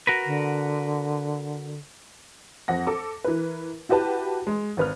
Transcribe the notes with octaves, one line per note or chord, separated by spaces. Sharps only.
F#4 A#4 B4
D3
F2 F#5 A#6
A4 D6
E3 A#4 B4
E4 F#4 G4 B4 A5
G#3
G#1 B4 F6